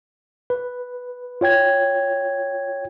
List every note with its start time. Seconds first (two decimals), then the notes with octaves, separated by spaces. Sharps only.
0.50 B4
1.41 F4 C#5 G5 G#6